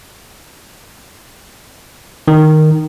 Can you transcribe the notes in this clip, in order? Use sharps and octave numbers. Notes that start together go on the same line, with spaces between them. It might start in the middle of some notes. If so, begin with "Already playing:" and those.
D#3